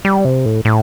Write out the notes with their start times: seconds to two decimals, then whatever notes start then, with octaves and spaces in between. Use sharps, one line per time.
0.05 G3
0.25 C3
0.46 A2
0.65 A2